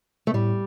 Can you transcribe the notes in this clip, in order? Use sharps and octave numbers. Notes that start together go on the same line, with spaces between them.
A3
A2 G3